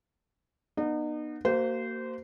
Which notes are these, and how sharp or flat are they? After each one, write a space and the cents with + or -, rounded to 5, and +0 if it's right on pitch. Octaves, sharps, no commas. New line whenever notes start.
B3 -30 D#4 -35
A#3 -20 F#4 +35 C5 -20